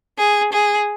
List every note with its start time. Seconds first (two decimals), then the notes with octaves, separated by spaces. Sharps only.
0.18 G#4
0.53 G#4